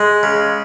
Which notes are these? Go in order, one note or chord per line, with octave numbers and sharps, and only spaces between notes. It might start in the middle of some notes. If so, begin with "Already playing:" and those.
Already playing: G#3
C#3